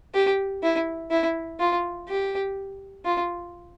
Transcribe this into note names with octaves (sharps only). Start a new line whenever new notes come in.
G4
E4
E4
F4
G4
F4